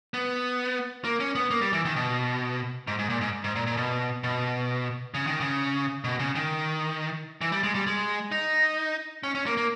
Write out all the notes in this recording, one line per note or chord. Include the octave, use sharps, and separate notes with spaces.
B3
A#3
C#4
B3
A#3
G3
E3
D#3
B2
G#2
G#2
A#2
G#2
G#2
A#2
A#2
B2
B2
C#3
D#3
C#3
B2
C#3
D#3
E3
G3
G#3
G3
G#3
D#4
C#4
C#4
A#3
A#3